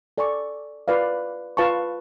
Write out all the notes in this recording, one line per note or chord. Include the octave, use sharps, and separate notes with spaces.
A4 D5 G#5 C#6
F4 B4 D5 F5
F4 B4 F5 A5 C#6